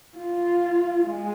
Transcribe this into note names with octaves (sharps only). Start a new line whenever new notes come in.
F4
G#3